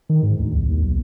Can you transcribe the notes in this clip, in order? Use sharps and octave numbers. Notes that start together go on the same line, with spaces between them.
D#3
G#2
D2
C2
D#2
B1